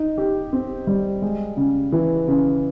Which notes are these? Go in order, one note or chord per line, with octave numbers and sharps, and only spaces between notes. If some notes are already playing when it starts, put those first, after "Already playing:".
Already playing: D#4
G4
C4
G3
G#3
C#3
E3
C#3